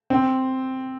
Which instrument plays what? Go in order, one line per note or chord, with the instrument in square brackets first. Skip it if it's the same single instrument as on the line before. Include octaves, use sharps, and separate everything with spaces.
[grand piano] C4